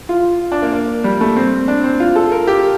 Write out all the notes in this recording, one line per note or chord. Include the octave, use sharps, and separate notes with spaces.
F4
D4
A#3
A#3
G3
A3
C4
D4
C4
F4
A4
A#4
G4